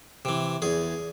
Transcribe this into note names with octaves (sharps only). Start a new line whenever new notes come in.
C3 E3
E2 G#4